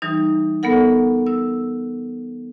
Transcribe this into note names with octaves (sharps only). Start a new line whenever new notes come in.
E3 G3 D#4
B3 A4 A#4 F#5
E6